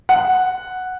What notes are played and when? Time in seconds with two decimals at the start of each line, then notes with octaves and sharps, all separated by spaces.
0.09 F#5